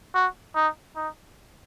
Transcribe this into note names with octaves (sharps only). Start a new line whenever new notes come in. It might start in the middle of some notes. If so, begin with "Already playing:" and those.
F#4
D#4
D#4